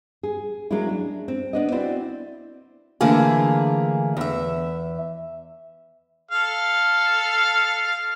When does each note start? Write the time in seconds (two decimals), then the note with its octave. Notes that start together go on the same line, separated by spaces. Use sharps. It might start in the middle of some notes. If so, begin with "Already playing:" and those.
0.23 G#4
0.71 F#3 G#3 A#3 C#4 E4
0.89 D4
1.28 C4
1.53 B3 D4 D#5
1.72 C4 E4 F#4 D5
3.01 D3 E3 A3 A#3 F4 G#4
4.17 E2 E5
6.31 A4 F5